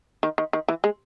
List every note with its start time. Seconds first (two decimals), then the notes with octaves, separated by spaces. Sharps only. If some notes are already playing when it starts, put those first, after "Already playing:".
0.23 D#3
0.38 D#3
0.53 D#3
0.68 E3
0.84 G#3